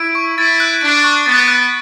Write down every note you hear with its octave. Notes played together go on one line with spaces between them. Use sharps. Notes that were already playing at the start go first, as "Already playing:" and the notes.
Already playing: E4 D7
C#6
E4 A6
F#6
D4 D7
C#6
B3 A6
F#6